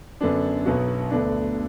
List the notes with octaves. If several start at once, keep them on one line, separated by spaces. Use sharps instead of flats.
F#2 D3 B3 D4
B1 B2 F#3 B3 F#4
D2 D3 B3 D4